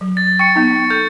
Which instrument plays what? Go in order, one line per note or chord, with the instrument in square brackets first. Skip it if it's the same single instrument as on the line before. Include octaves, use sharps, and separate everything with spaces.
[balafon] F#3
[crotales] A6
[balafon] G5 [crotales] C#6 A6 C#7
[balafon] B3 D#4
[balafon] A4 [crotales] G6